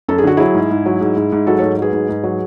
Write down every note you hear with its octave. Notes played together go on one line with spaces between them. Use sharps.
F#2 A4
G#4
D3 F#4
F#3 E4 G#4
G#2
G#2
F#3
G#2
G#2
G#2
F#3 F#4 A4
G#2 A4 C#5
F#3 G#4 B4
G#2
G#2
F#3